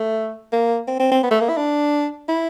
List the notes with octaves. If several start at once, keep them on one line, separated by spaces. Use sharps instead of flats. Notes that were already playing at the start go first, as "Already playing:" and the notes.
Already playing: A3
A#3
C4
C4
C4
B3
A3
A#3
E4
D4
E4